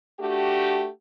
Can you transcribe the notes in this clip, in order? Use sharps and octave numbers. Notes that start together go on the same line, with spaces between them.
A3 D4 F#4 G4